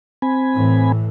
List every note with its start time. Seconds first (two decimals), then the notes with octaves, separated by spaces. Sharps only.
0.22 C4 G#5 B5
0.56 A2 E3